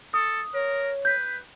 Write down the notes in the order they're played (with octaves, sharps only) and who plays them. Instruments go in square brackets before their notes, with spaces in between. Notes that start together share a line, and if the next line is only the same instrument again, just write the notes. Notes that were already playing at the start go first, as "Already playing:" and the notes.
[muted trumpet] A4 [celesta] D#6
[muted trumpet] A#4 [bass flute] C#5
[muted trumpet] B4 [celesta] G6 B6